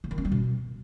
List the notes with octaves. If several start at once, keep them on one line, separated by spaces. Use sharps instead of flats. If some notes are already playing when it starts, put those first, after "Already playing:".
D3
D#3
C#4
G3
B2